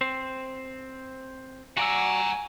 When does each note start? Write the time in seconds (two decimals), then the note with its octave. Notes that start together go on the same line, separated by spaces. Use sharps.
0.01 C4 C5
1.77 F#4 D5 F#5 G#5 A#5 E6